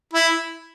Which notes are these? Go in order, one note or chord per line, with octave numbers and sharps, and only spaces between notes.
E4